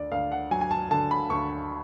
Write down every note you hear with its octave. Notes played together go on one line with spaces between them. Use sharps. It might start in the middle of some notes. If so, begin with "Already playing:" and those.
Already playing: D2 D5
D2 F5
F#5
F#3 G#5
G#5
A5
D3 A5
B5
D2 C#6